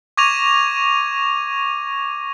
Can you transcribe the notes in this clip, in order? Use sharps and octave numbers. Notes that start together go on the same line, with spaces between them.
C#6 D6 G#6 A#6 D#7 F7